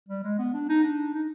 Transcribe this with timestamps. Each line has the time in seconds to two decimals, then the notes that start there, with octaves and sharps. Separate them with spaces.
0.09 G3
0.24 G#3
0.39 B3
0.54 D4
0.69 D#4
0.84 D4
1.14 D#4